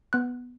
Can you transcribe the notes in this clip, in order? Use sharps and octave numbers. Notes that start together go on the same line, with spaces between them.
B3 F#6